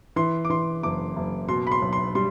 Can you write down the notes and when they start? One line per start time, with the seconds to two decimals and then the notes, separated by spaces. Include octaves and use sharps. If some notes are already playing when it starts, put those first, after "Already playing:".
0.16 E3 C6
0.45 D6
0.50 E3 C6
0.83 F#1 D6
1.16 F#1
1.48 B2 C6
1.67 B5
1.72 C6
1.82 B1
1.93 C6
2.15 G3 C6